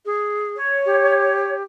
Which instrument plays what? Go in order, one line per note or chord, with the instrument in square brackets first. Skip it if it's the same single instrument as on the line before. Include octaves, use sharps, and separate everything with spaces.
[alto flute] G#4
[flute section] C#5
[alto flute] G4